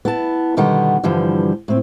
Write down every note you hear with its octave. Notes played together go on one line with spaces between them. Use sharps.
B3 E4 A5
B2 D3 D#3 G3 B3 F#5
G2 D3 E3 F3 G3
A2 C4